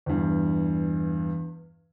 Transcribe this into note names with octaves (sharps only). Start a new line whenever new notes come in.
E2 G2